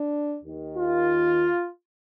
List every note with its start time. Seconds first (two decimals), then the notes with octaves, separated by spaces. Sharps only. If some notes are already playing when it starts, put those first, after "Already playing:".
Already playing: D4
0.42 D#2 D#3
0.76 F4